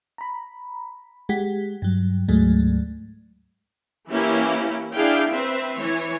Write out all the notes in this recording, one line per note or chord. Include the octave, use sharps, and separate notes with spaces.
A#5 B5
G#3 G4 F#5 B6
G2 F#3
D2 G#2 F#3 G#3 A3
E3 A#3 C#4 E4 G4
D4 E4 G#4 F5 G5
C4 B4 E5
E3 C#5